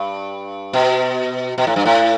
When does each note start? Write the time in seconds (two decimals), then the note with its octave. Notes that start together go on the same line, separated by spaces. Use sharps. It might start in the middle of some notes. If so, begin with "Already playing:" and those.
Already playing: G2
0.73 B2
1.58 B2
1.67 A2
1.76 G2
1.85 A2